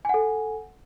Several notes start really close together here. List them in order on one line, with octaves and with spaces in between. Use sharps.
G#5 F#5 A4